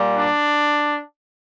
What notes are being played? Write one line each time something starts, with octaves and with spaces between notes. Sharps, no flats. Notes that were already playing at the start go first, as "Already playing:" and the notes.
Already playing: A#2 G3 A#3
D4